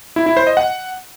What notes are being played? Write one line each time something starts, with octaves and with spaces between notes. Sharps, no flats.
E4
E4
C5
D#5
F#5